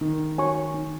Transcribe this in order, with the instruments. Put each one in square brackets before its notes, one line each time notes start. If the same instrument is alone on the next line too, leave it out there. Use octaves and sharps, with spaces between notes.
[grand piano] D#3 [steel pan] D#4
[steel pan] F#4 C#5 G#5 C#6
D#4